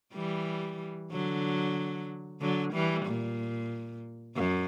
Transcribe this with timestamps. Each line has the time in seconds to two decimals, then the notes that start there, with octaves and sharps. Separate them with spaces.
0.14 E3 G3
1.11 D3 F#3
2.41 D3 F#3
2.73 E3 G3
3.06 A#2
4.36 F#2